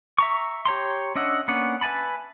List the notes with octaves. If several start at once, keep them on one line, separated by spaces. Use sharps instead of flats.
E5 A#5 C#6
G4 C#5 A#5 C6
C#4 D4 D#5 E5 F#5
A#3 B3 C#4 D4 F#5
B4 E5 G#5 A5 B5